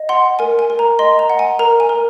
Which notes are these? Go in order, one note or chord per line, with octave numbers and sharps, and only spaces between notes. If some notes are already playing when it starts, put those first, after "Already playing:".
Already playing: D#5
F#5 C6
A#4 G#5
G#5
A#4
A#5
D#5 C6
A#5
F#5
G#5
A#4 A#5
G#5
A#4